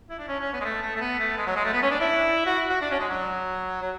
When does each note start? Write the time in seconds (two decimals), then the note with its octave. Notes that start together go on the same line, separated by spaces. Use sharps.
0.10 E4
0.19 D4
0.28 C#4
0.40 C#4
0.53 B3
0.60 G#3
0.65 A3
0.82 A3
0.96 A3
1.01 B3
1.20 A3
1.37 G#3
1.46 F#3
1.56 G#3
1.64 A3
1.73 B3
1.82 C#4
1.91 D4
2.01 E4
2.46 F#4
2.70 F#4
2.82 D4
2.91 C#4
3.00 G#3
3.09 F#3
3.82 F#3